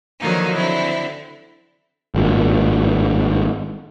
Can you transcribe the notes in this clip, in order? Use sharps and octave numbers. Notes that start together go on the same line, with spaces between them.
D3 D#3 F3 F#3 A#3 D#4
D3 C4 E4
G#1 G2 A#2